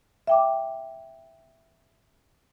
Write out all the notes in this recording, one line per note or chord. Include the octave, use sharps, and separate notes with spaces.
E5 G5 D6